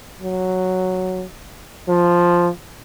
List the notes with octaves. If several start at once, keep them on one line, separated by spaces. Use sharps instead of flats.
F#3
F3